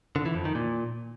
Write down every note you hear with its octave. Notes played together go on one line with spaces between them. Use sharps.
D3
E3
F2
D#3
A#2